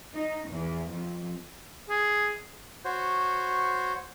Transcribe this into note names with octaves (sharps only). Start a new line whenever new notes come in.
D#4
E2
F2
G#4
F#4 C5 C#5